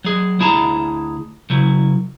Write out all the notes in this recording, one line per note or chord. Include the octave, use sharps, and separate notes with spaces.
F#3 G#4
D2 E4 G#4 A5 A#5
C#3 F#3 E4